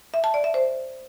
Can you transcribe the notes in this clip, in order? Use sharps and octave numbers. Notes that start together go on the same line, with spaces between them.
E5
A5
D5
E5
C5